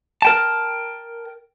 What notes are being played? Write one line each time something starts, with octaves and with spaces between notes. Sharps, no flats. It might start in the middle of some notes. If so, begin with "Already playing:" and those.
A#4 G5 A5